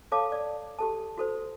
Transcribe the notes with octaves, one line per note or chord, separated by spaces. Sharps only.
A4 C#5 F5 A5 D6
D5
G4 A4 A5
F#4 A4 C5